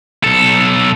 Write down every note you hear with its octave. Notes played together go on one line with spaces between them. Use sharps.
B1 A4